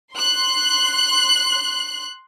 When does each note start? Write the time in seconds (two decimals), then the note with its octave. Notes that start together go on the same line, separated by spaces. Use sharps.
0.14 C6 F#6